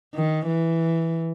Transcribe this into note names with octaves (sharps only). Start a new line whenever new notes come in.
D#3
E3